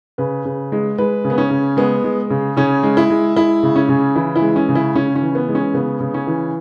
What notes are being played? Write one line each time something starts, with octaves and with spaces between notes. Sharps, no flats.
C#3 B4
C#3
G#3
G#3 B4
C#3
B3
C#4
C#3
G#3 B3
G#3
C#3
C#3 C#4
G#3
E4
G#3
G#3 E4
C#3
C#4
C#3
E3 E4
E4
G#3
C#4
C#3
E4
C#3 C#4
C#4
E3
B3
G#3
C#4
C#3 B3
C#3
C#4
E3